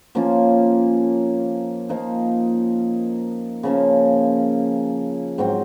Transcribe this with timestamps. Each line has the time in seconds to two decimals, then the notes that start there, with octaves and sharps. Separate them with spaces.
0.15 F3 A#3 C#4 F4
1.89 F3 A#3 D#4
3.63 C#3 F3 A#3 C#4
5.38 G#2 F#3 C4